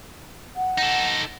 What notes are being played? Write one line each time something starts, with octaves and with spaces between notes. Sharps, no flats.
F#5
D#4 A4